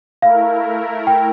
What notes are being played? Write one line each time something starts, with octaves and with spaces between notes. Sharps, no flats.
A3 E4 A#4 F5
G5